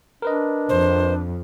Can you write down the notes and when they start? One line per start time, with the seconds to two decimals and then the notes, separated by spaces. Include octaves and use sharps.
0.22 D4 A#4 B4 D#5
0.69 F2 C5